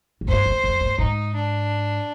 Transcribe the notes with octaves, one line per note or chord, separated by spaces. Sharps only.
G#2
G2 C5
F2
F2
G2
G#2 D#4
D4